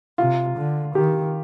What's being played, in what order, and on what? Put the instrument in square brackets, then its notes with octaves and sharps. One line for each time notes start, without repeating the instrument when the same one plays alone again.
[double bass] C3 [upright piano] F4
[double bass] D3
[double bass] D#3 [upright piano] G4